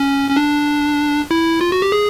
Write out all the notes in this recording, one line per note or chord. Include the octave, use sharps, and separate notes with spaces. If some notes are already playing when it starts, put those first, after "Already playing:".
Already playing: C#4
C#4
D4
E4
F4
F#4
G4
G#4